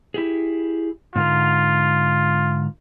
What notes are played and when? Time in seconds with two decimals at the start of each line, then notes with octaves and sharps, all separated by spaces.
0.14 E4 G4 G#4
1.16 G#2 D3 F4 A#4